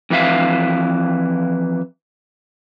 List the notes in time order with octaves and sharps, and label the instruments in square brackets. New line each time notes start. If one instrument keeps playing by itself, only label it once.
[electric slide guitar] F2 E3 A#3 E5 F5